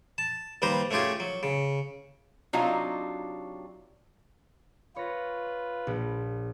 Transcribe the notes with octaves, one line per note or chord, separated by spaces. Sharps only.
A5
D#2 G3 B4 C5 A#5
A3 C#4 F4 G4 G#4
F#3
C#3
C3 F#3 D4 D#4 F4
F4 B4 C#5 A#6
A#1